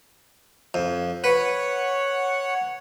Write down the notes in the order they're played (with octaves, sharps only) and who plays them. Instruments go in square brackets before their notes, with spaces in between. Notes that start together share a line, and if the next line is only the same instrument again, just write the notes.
[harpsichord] F2
[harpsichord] B4 [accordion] C#5 F#5